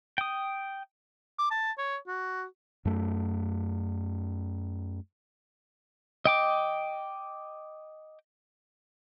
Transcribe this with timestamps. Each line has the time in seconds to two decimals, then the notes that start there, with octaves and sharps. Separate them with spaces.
0.18 G5 D#6
1.39 D6
1.51 A5
1.78 C#5
2.07 F#4
2.85 F#2 A3
6.25 D#5 G5 D6